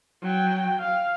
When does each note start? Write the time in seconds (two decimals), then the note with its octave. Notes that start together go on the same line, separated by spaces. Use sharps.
0.23 F#3 G5
0.79 F5